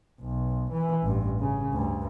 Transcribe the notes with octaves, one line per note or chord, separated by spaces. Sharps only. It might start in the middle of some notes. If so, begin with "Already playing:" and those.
B1
E3
A1 G2
C#3
D2 G2